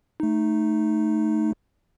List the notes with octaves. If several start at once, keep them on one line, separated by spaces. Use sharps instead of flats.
A3 D#4